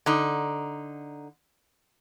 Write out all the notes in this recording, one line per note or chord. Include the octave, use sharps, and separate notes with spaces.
D3 D#4